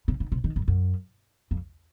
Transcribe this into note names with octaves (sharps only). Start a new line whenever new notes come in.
C#3
C#3
C3
D#3
F2
F#2
F2